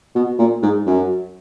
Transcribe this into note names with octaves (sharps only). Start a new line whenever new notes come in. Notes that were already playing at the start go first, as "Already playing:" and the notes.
B2
A#2
G#2
F#2